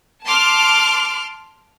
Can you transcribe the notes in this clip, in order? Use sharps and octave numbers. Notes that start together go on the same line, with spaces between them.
A5 C6 D6 F6